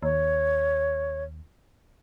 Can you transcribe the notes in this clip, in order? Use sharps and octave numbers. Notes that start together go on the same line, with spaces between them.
D#2 C#5